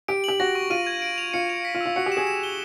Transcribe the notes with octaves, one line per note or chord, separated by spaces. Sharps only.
G4 D7
G4 F#7
F#4 A#6
C#6
F4 D#7
G#6
D7
F7
F4 C#7
F7
B6
F4
E6
F4
F#4 C#7
G4
E7
G#4
E7
G7